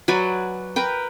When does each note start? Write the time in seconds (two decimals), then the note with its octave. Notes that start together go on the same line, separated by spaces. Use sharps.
0.08 F#3 B4 D5 G#5
0.76 A#4 B4 G5